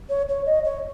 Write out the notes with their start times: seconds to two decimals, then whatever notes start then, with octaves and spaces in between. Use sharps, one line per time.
0.09 C#5
0.28 C#5
0.46 D#5
0.64 C#5